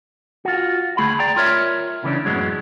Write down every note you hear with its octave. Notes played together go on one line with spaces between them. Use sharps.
F4 F#4
D2 B2 A3 G#4 B5
D5 G5 A#5
F4 A#4 C#5 E5
C#3 E3 B3 C#4 D4
F#2 A2 F#3 G#3 B3 C#4